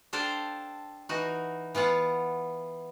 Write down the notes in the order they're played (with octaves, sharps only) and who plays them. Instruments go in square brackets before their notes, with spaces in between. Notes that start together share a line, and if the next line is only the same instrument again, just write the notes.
[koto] D4 A4 C5 F5 G5
E3 D#4 F#4
E3 B3 F4 F#5